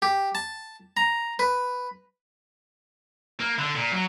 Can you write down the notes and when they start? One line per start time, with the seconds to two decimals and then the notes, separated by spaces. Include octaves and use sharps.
0.02 G4
0.35 A5
0.97 A#5
1.39 B4
3.40 A#3
3.58 D3
3.75 A#2
3.92 F#3